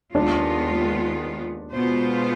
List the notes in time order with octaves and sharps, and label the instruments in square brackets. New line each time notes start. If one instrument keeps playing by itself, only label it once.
[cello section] D#2 D#3 G#3 B3 F4 [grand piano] D4
[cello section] B2 G#3 B3 F4 C5